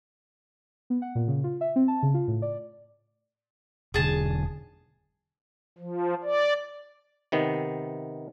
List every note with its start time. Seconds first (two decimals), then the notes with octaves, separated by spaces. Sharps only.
0.90 B3
1.02 F#5
1.15 A#2
1.28 C#3
1.44 F4
1.61 E5
1.76 C4
1.88 A5
2.03 C#3
2.14 F4
2.28 A2
2.42 D5
3.94 E1 D3 G#4 A5
5.78 F3
6.24 D5
7.32 C3 D#3 B3